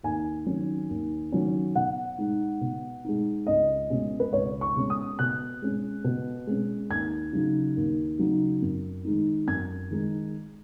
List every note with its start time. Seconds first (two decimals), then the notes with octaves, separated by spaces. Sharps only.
0.03 D#2 G#5
0.46 D#3 F#3 C#4
0.90 D#2
1.32 D#3 F#3 C#4
1.75 B2 F#5
2.18 G#3 D#4
2.61 B2
3.05 G#3 D#4
3.47 C#2 D#5
3.90 B2 G#3 C#4
4.20 B4
4.33 C#2 C#5
4.61 C#6
4.76 B2 G#3 C#4
4.90 D#6
5.19 B2 F#6
5.62 G#3 C#4
6.04 B2
6.47 G#3 C#4
6.90 D#2 G#6
7.33 C#3 F#3 D#4
7.77 D#2
8.19 C#3 F#3 D#4
8.62 F#2
9.05 D#3 G#3 D#4
9.47 F#2 G#6
9.91 D#3 G#3 D#4